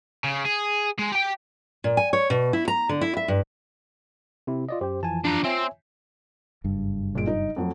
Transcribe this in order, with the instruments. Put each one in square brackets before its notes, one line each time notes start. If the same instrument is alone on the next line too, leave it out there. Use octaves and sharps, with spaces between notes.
[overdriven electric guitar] C#3
G#4
G#3
G4 G5
[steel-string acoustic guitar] A#2
G#5
C#5
B2
E4
A#5
D3
E4
E5
G2
[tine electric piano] C3 C4 E4
F4 D5 D#5
[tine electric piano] F#2 G4 [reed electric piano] C5 G5
[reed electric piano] F2 E3 F3 [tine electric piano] G#5 A5
[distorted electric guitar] D4 A#5 [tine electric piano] F4
[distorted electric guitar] C4 [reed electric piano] C#5 E5 G#5
[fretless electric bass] F#1 G2
[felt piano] A#2 G#3 D7
D#4
F2 F#3 A3